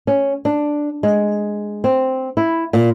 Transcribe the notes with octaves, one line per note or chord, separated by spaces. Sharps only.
C#4
D4
G#3
C4
E4
A#2